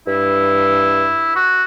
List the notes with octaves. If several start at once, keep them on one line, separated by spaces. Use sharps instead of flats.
G2 E4
F#4